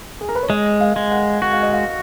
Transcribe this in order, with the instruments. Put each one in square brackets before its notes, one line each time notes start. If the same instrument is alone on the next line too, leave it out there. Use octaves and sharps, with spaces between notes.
[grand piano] G#4
A#4
B4
C#5
[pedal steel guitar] G#3 [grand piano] D#5
[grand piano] F5
[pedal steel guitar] G#3
[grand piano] F#5
[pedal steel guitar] F#4 [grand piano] F#5
[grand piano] F5
D#5
F5